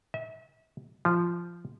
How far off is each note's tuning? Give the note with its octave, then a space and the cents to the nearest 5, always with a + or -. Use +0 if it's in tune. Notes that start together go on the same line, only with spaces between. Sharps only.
E5 -35
F3 -10